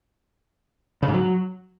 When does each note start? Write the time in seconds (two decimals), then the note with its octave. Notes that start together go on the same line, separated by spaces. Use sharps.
1.02 C#3
1.08 G#2
1.13 F#3